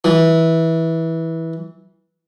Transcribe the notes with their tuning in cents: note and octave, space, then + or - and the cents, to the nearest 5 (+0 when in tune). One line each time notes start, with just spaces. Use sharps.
E3 -15